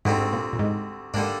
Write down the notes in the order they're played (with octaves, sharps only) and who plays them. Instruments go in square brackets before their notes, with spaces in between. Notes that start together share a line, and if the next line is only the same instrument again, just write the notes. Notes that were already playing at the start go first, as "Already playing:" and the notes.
[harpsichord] D2 D3 G3 C4 [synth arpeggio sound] G#2
[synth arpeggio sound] G#2
A#2
A#2
G#2
[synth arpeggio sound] G#2 [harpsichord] D3 G3 A#3 D4